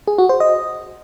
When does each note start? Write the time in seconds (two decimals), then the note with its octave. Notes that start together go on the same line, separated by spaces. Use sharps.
0.07 G#4
0.18 F#4
0.29 C5
0.40 D#5